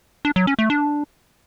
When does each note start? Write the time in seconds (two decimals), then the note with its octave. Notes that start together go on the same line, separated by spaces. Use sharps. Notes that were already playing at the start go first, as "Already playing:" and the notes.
0.25 D4
0.36 F#3
0.47 C#4
0.59 A3
0.70 D4